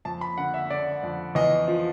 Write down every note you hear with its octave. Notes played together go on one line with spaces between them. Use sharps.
F2 A5
B5
D3 F#5
E5
D3 D5
F2
E2 D#5
F3